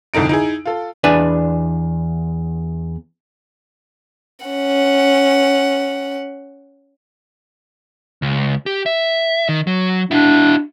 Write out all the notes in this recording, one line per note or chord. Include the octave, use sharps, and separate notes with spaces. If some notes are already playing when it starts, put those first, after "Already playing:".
C2 F2 D3 D#4 D7
D#4 E4 G#4
F4 A4
E2 D4 B4 D5 E5 G#5
C#4 F#5
C#2
G4
E5
D#3
F#3
D4 E4 F#4